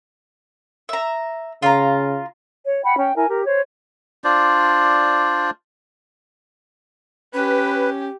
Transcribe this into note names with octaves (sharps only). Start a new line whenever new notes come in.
E5 A#5
C#3 F4 A#5
C#5
F#5 G5 B5
C#4 G5
E4 A#4 G#5
G4 A#4
C5 C#5
D4 F4 C5 D5
C#4 G4 B4